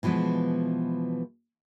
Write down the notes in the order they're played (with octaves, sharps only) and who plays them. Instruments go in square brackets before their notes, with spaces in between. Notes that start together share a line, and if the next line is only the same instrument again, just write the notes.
[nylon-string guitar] B2 E3 F3 G#3 B3